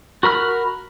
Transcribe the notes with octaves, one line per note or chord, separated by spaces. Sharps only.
F#4 A#4 B5 F6